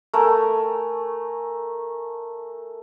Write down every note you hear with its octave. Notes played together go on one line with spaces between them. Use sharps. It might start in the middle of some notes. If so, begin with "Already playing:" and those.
A3 A#4 G#5